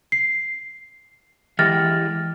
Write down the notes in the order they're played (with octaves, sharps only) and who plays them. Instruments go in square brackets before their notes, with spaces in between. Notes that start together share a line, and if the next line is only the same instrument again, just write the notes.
[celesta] C7
[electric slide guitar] E3 G#3 G4 [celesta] F6 A6 A#6